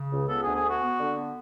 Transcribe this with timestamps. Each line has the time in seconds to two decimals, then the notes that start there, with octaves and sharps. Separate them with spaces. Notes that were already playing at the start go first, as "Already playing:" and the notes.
Already playing: C#3
0.11 C#2
0.29 B3 A4
0.42 G#4
0.46 D2
0.55 G#4
0.65 B3 F#4
0.82 B3
1.00 D3
1.17 B3